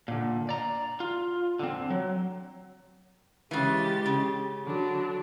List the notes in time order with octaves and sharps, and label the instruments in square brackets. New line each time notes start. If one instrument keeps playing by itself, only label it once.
[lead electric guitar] A#2 D3
D5 A#5
F4
D3 C4
F#3
[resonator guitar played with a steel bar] C#3 E3 [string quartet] G#3 G4 A6
[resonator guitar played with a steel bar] C#3
[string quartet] D3 F#3 D4